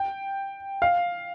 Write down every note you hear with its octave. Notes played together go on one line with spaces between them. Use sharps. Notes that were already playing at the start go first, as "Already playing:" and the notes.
Already playing: G5
F5